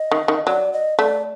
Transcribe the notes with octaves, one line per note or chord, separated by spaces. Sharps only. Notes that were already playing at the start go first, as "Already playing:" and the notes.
Already playing: D#5
D#3
D#3
F#3 D5
D#5
A3 D5